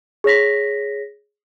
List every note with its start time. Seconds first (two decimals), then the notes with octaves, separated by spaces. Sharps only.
0.24 G#4 C#5 A#6 B6